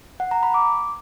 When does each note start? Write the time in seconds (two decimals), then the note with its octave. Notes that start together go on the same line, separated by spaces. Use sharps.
0.20 F#5
0.31 A#5
0.43 B5
0.54 D6